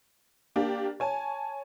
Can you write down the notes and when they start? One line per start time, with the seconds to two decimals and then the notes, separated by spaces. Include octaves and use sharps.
0.56 A#3 D4 G4
1.00 C#5 G#5 A5